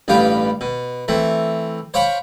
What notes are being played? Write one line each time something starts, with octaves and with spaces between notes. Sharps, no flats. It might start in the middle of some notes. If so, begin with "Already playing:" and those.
A1 G2 B3 G4 F5 G5
B2
E3 A3 C4
C5 C#5 F5 G5 B5 C#6